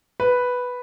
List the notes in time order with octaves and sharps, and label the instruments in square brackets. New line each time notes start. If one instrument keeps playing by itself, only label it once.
[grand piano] B4